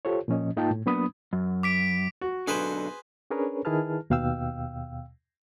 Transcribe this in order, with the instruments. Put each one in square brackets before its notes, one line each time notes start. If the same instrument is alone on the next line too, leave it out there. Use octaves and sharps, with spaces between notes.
[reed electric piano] F4 G4 A4 C5 C#5
A#2 F3 C#4 D#5
G#2 A#3 D#4 F4 G5 A5
A2
F#3 A#3 B3 D4 B5 D#6
[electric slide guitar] F#2
[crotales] D6 B6 D7
[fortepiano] F#4
[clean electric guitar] B1 G#2 D3 [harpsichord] G#4 B4 C5
[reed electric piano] C#4 D4 G#4 A#4 B4 C#5
D#3 E4 G#4 B4 A5 F6
D#2 B2 F5 G5 E6